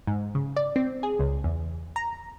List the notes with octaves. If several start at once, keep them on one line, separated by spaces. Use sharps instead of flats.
G#2
C#3
D5
C4
G#4
C#2
E2
A#5